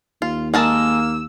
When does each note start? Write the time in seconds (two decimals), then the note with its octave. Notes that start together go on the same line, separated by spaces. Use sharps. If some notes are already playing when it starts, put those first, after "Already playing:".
0.22 D#2 F4
0.54 G#3 A#3 A#4 A5 E6